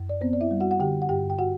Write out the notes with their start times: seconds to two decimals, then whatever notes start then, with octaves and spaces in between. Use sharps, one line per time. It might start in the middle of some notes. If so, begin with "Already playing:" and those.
Already playing: F#2
0.09 D5
0.21 B3 C4 C5
0.33 D5
0.41 E4 E5
0.51 G3
0.60 F#4 F#5
0.71 F#5
0.80 D3 G4 G5
1.02 F#5
1.09 G2 G4 G5
1.30 G5
1.39 F#4 F#5